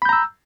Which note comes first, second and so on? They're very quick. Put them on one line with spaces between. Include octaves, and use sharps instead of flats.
B5 G6 A#5 E6